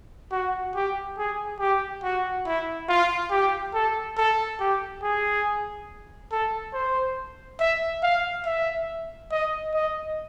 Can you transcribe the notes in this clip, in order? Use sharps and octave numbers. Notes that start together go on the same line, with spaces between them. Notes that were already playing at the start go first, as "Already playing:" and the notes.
F#4
G4
G#4
G4
F#4
E4
F4
G4
A4
A4
G4
G#4
A4
C5
E5
F5
E5
D#5
D#5